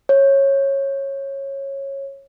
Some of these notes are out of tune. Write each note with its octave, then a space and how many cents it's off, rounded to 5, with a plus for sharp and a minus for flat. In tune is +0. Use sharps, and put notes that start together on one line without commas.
C#5 -15